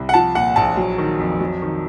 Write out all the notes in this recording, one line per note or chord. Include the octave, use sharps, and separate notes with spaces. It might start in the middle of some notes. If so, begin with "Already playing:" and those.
Already playing: C2
F#5
F3 A5
A#2 F#5
A#1 A5
F#3
D#3
F2
F#3
D#3